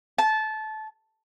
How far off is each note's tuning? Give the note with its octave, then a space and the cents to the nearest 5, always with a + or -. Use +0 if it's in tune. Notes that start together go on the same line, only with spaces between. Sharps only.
A5 -20